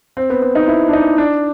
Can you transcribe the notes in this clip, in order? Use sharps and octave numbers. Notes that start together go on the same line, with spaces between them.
C4
B3
B3
D#4
E4
D4
D#4
D4